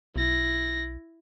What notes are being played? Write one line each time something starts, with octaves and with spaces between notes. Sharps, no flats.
B1 E4 A#6